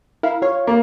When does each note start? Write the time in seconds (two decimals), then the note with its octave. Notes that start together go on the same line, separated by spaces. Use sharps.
0.23 E4 A#4 F5
0.42 F4 C#5 F5
0.67 A#3